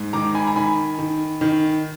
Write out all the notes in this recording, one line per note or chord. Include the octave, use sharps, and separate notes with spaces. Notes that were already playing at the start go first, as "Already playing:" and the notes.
Already playing: G#2
D#3 A#5 D6
G#5 B5
A#5
D#3 G#5 B5
D#3
D#3